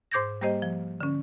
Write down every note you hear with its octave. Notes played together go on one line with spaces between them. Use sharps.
G#2 C5 D6 G6 G#6 A#6
G3 A#3 G4 C5 D#5
F3
D3 C#4